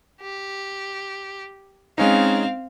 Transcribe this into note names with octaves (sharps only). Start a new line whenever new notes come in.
G4
G#3 C4 C#4 D#4 F5